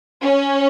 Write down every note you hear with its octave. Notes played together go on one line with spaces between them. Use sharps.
C#4